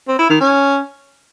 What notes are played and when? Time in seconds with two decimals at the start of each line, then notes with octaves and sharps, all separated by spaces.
0.08 C4
0.19 E4
0.30 D#3
0.40 C#4